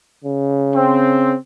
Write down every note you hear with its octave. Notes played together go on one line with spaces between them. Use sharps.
C#3
C4